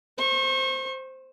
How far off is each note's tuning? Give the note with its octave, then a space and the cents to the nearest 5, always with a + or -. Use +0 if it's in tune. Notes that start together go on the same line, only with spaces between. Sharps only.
C5 +0 C#6 -40